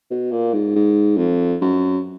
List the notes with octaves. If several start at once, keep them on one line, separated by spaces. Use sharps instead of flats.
B2
A#2
G#2
G#2
F2
F#2